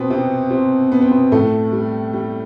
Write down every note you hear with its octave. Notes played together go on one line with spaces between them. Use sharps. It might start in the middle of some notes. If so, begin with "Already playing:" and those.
Already playing: B2 B3 C4
C3 C4
C3 C4
B3
C4
B2 B3
A2 A3
G3
G3